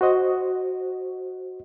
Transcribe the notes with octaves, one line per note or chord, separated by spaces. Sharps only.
F#4 C5 D#5